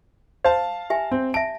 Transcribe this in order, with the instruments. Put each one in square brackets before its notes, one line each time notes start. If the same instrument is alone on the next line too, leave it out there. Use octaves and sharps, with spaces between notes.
[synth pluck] C5 [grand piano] F5 A5
[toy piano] G4 E5 G#5
[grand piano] C4
[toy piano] E5 A5 [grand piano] D7